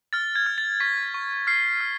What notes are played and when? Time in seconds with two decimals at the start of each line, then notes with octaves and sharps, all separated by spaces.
0.13 F6 A6
0.36 G#6
0.46 F6
0.58 A6
0.80 C#6 B6
1.14 C#6
1.47 F6 C7
1.81 F6